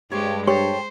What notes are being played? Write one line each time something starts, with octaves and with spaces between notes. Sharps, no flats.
G2 G#3 G4 C5 C#5
G4 A4 C5 C#5